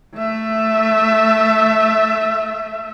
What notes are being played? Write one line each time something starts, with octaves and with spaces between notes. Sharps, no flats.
A3 E5